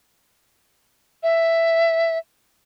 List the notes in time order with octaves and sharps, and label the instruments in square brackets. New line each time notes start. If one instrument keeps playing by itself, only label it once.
[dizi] E5